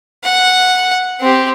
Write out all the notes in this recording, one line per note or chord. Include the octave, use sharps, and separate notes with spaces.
F#5
C4 G4